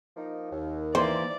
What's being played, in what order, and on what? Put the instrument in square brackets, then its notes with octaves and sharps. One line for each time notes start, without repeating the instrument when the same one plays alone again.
[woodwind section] F3 A#3 D#4
D#2
[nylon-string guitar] E3 A#3 B4 [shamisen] C5 [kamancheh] D5